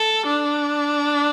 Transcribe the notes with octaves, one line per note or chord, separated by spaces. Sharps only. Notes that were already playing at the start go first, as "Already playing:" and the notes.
Already playing: A4
D4